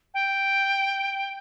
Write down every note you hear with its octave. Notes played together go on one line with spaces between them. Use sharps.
G5